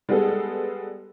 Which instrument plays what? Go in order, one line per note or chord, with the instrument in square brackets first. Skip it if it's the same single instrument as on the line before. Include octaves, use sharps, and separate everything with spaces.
[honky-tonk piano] G3 G#3 B3 G#4 A4